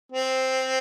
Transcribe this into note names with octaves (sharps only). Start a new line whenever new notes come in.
C4